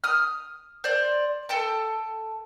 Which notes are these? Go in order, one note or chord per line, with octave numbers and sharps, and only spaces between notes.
D#6 F6
C5 D5
A4 G5 A5